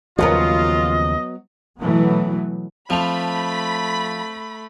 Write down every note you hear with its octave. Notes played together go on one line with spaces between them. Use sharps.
D#2 C#3 F3 F#3 B3 F4 A#4 D#5
B2 E3 F#3 A3 B3
F3 A3 C4 A5 B5 F7